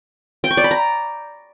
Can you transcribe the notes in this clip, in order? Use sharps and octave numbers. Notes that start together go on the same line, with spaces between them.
G5
C#6
D5
B5
A#5